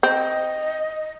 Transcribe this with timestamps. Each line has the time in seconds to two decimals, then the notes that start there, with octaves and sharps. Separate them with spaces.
0.03 C4 D#5